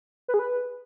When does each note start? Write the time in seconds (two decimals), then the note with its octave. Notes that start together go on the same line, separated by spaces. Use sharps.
0.28 B4
0.34 G#4
0.39 B4